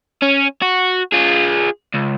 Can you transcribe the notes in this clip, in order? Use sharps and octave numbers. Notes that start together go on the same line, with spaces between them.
C#4
F#4
F4 G#4
C#2